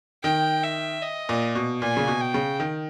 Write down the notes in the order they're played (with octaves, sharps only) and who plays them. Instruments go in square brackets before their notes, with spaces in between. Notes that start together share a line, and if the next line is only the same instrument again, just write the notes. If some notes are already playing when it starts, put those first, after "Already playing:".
[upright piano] D#3 [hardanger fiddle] G5
[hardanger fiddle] E5
D#5
[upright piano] A#2
B2
[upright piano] A#2 [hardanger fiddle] G#5
[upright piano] C#3
B2
[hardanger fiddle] G5
[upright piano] C#3
D#3